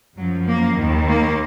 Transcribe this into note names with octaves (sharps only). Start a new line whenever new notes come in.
F#2 F3 F#3
A#3
D#2 D#3
A#3